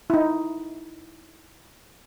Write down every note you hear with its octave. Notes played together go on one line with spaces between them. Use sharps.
D#4 E4